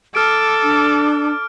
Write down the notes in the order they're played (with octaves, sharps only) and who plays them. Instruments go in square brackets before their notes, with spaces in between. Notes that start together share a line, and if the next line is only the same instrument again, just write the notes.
[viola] A4 [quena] D6 [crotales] F6 D7
[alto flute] D4